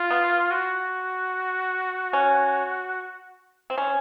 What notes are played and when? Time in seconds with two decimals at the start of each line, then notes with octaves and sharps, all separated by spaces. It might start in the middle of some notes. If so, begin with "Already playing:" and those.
Already playing: F4
0.11 B3
0.51 F#4
2.13 C#4
3.70 C4
3.78 C#4